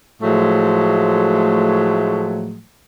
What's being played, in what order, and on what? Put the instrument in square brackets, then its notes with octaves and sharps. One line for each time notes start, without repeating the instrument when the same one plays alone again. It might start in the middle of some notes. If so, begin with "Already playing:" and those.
[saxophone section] A2 F3 F#3 G#3 A3